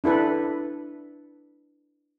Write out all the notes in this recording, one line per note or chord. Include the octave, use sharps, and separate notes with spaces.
D4 E4 A4 B4